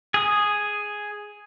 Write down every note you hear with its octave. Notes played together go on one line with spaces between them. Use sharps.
G#4 D#6